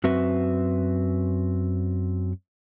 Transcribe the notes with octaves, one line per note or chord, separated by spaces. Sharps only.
F#2 C4 F#4 B4 E5